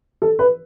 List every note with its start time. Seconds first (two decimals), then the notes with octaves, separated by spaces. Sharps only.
0.22 A4
0.39 B4